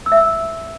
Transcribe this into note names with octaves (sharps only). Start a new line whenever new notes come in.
E6
E5
E6